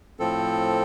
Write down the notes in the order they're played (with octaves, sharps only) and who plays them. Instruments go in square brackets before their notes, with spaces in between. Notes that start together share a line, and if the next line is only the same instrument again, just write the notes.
[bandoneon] A2 F3 C4 A4